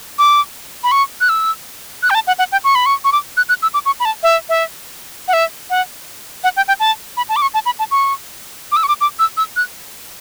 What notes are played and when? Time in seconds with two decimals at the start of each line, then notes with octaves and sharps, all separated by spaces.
0.18 D6
0.83 B5
0.91 C#6
1.21 F#6
1.29 E6
2.02 F#6
2.10 G5
2.15 A5
2.27 F#5
2.39 F#5
2.52 G5
2.64 C#6
2.75 B5
2.86 C#6
3.04 C#6
3.12 D6
3.37 F#6
3.49 F#6
3.62 E6
3.74 D6
3.86 C#6
4.00 B5
4.05 A5
4.23 E5
4.49 E5
5.28 F#5
5.33 E5
5.70 F#5
6.44 F#5
6.56 G5
6.68 G5
6.80 A5
7.17 B5
7.29 A5
7.36 D6
7.42 C#6
7.54 A5
7.65 B5
7.79 A5
7.91 C#6
8.72 D6
8.76 E6
8.83 C#6
8.88 D6
9.01 D6
9.19 E6
9.37 E6
9.56 F#6